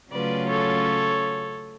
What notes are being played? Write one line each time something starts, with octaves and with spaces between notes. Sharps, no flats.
C#3 F#3 A3 C#4 F4 B4 D5
A4 C#5